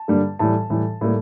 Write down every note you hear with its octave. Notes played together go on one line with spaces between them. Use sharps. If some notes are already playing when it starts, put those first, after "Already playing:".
Already playing: A5
G2 D3 G3 A#3
A2 E3 G3 A5
A2 E3 G3
A2 G3 A#3